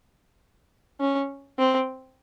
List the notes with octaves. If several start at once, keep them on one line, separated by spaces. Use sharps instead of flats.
C#4
C4